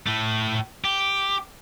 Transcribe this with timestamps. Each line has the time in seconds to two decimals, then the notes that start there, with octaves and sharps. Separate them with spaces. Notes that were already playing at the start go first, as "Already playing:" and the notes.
0.07 A2 A3
0.84 G4